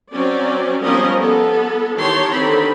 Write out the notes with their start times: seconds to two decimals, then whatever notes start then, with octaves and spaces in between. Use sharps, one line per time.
0.11 F#3 C4 C#4 D5
0.83 F3 G3 B3 C#4 A#4 D#5
1.20 B3 A4
1.96 D#3 E3 G4 C#5 A5 C6
2.33 D3 D#3 C4 B5